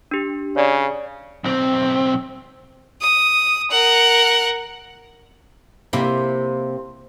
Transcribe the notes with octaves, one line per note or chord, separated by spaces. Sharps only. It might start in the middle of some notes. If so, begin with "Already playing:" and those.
D4 G4
C#3 C#5 D5 A#5
B1 C4
D#6
A#4 F#5
C3 A#3 E4